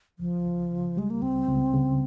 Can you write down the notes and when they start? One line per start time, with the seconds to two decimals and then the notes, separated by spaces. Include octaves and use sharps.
0.19 C#2 F3
0.45 C#2
0.71 C#3
0.97 G3 G#3
1.10 A#3
1.22 C#2 C4
1.48 C#2
1.74 C#3